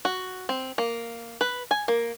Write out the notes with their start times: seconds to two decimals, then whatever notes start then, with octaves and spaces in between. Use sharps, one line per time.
0.05 F#4
0.49 C4
0.78 A#3
1.41 B4
1.71 G#5
1.88 A#3